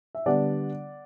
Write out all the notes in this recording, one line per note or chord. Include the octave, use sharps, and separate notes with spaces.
E5
D3 G3 B3 D4 D5 F#5